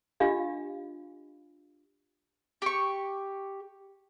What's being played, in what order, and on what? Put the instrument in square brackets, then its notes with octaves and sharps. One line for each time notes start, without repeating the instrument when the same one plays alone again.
[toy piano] D4 F4 G4 D#5 F5
[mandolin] G4 C#6